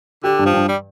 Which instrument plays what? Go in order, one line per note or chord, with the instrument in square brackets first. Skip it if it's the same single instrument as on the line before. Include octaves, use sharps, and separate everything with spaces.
[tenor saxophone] D3 [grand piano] G4
[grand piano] G2
[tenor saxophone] F3
[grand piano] G2
[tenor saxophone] G3